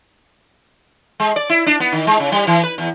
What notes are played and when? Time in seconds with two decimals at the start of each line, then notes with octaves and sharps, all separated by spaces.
1.20 G#3
1.36 D5
1.49 E4
1.66 D4
1.80 B3
1.92 D#3
2.07 G#3
2.20 C#3
2.32 G3
2.47 E3
2.63 B4
2.78 E2